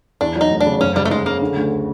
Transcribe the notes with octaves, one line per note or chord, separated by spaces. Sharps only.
E2 D4
F#3
D#4
F1
D4
C#3
F#1 C#4
C#3 G3
A3
F#1 G#3
C#3 A#3
D3
D2